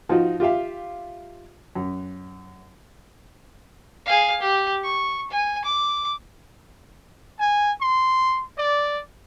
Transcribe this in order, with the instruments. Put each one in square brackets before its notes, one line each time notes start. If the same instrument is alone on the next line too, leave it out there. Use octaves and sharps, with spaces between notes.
[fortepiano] F3 D#4 F4 F#4
F4 G4 E5 F5
F#2
[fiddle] G#4 F5
G4
C#6
G#5
D6
[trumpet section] G#5
C6
D5